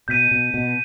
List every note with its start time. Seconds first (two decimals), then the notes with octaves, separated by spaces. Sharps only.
0.08 B2 G6 B6 D#7
0.31 B2
0.54 B2